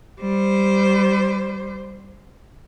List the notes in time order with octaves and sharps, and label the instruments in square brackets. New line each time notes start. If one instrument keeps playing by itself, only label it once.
[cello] G3 C5